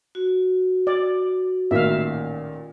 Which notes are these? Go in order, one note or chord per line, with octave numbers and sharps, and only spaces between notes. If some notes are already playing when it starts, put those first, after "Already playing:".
F#4
D5
A1 A#2 D#3 E5 F5